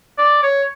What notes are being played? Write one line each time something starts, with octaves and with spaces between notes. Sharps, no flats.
D5
C#5